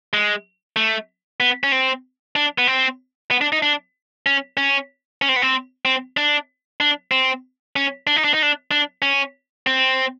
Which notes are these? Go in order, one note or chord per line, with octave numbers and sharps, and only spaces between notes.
G#3
A3
B3
C#4
C4
D4
B3
C4
B3
D4
D#4
D4
C#4
C#4
C#4
C4
B3
C4
C4
D4
D4
C4
C#4
D4
D#4
D4
D#4
D4
D4
C#4
C4